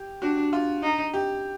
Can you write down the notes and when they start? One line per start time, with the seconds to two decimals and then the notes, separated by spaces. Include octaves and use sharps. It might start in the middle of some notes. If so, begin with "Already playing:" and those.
Already playing: G4
0.22 D4 F#4
0.53 F4
0.83 D#4
1.14 G4